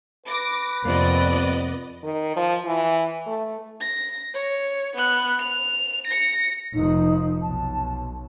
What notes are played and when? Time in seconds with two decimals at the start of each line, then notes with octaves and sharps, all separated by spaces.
0.26 B4 D6 A#6
0.85 F2 C3 A#3 B3 D5 D#5
2.03 D#3
2.37 F3
2.66 E3
3.27 A3
3.80 A#6
4.34 C#5
4.96 B3 F#6
5.39 F7
6.07 A#6 C#7
6.74 F1 F3 D#4
7.42 B1 A5